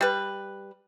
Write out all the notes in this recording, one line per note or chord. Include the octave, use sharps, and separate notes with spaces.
G3 B4